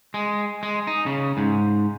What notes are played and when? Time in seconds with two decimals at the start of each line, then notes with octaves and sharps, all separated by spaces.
0.14 G#3
0.63 G#3
0.87 D#4
1.06 C#3
1.37 G#2